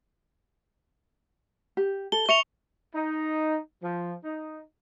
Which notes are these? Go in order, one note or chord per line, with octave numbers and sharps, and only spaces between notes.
G4
A4 G7
E5 C#6 C#7 F7
D#4
F3
D#4